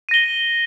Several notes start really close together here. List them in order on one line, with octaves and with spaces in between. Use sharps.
D#7 A#6 G7